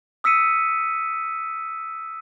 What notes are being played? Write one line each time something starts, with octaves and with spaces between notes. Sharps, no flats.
D#6 E6 B6 C#7 D#7